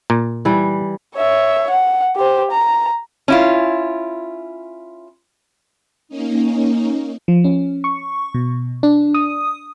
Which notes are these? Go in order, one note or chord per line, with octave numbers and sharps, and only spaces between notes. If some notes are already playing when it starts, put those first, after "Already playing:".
A#2
E3 G3
C#5 E5
F#5
G4 C5
A#5
C#4 E4 F4
A#3 C#4 D#4
F3
C#4
C#6
B2
D4
D#6